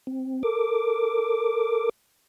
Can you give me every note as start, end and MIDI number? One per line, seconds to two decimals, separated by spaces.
0.07 0.43 60
0.43 1.89 69
0.43 1.89 70
0.43 1.89 86